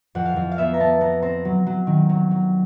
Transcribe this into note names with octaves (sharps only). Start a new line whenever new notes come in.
F2 F#5
F5
F2
F5
B3 E5
A#5
B3 A5
B3 A#5
C4 A#5
F#3
F#3
D#3
F#3
F#3